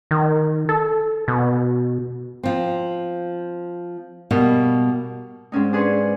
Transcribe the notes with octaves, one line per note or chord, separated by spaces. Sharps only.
D#3
A4
B2
F3 C4
B2 G3 A#3 F#4
G#2 C4 C#4 D#4
D4 G#4 B4 C6 C#6